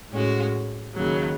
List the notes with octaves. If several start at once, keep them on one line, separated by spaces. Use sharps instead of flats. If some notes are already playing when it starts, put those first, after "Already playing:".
A2 G#3 C#4 F#4
D#2 C#3 F#3